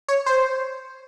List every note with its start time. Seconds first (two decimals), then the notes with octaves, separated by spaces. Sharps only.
0.08 C#5
0.26 C5